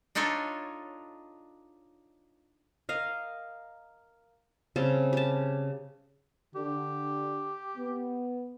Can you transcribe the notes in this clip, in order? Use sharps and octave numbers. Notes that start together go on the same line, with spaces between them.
D4 D#4 F4 A4 C#5
A#4 D#5 F5
C#3 G3 C4 A5
G4 A5
D3 G4
B3